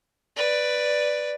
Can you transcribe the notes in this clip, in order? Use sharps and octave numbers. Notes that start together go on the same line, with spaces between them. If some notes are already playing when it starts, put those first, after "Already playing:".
B4 D5